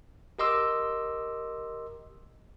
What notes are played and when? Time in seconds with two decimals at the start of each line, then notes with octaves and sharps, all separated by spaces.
0.39 G4 A#4 D#5 C6 D6 E6